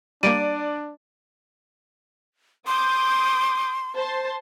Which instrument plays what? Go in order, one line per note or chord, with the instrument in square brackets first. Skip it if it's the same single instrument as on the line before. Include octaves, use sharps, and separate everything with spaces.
[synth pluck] G3 A#3 [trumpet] D4 [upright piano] D5 [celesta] D7 D#7
[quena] C6 [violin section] D6 D#6 G6
[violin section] C5 A5 C6